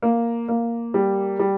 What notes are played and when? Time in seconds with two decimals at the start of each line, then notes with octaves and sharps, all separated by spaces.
0.02 A#3
0.48 A#3
0.94 G3
1.39 G3